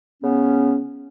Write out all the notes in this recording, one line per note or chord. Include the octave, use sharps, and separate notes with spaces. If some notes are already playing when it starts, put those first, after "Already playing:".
C#3 B3 C#4